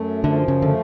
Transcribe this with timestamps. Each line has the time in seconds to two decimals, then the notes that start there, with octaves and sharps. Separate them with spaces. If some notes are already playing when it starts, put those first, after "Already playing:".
Already playing: F#2 A3
0.24 D3 F3
0.48 C#3
0.61 D3 A3